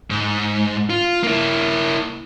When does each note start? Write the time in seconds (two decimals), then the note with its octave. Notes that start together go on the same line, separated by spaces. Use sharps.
0.10 G#2
0.90 F4
1.23 A#3 E4